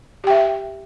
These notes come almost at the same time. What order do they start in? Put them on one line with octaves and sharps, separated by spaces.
G4 G5 E5